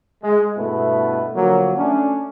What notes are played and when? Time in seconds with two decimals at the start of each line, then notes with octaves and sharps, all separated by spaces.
0.23 G#3
0.57 G2 B2 A3 B3 E4 B4
1.34 D3 F3 F#3 A#3
1.77 A3 C#4 D4